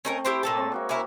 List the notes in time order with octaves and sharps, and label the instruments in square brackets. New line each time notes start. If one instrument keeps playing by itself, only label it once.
[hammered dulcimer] A3 C4 [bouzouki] C#4 D#4 A#4
[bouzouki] E4 G4 C5
A#2 A4 A5
[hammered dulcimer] G#3 C4 C#5
A#3 F#4 E5
[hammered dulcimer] A#3 [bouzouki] C#4 E4 A#4